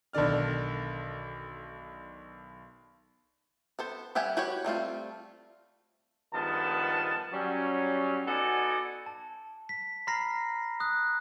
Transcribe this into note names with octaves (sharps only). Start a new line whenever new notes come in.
B1 D3 D#3 D5 F6
B3 A4 C5
G3 G4 E5 F#5 G#5
F#4 G4 B4 C#5
G3 A3 C4 F4
G2 D#3 F3 G#3 B3 A5
F#3 G3 C#4
B3 D#4 F#4 A4 D5 G#5
A5
B6
A#5 B5 F6 A#6 C7
D#6 F#6